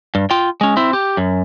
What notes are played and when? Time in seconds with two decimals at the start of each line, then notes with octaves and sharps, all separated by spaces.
0.15 G2
0.31 F4 G5
0.61 G#3 C#4
0.77 C4 E4
0.93 G4
1.17 F#2